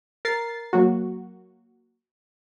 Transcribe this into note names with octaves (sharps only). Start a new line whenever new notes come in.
A#4 A6 C7
F#3 A#3 F#4